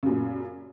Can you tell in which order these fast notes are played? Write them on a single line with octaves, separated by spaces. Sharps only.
C#3 F#2 A#2